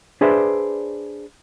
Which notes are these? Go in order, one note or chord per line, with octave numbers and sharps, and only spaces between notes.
D4 G#4 B4 C5 D5 E5